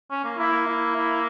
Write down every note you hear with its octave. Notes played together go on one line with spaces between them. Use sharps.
C#4
A#3
A#3 E4
A#3
E4
E4